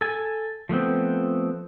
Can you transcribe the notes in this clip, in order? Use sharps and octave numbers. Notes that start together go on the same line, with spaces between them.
A4 G#5
F3 A3 B3 C4